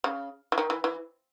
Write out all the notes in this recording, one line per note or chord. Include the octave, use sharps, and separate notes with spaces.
C#3
E3
D#3
E3
E3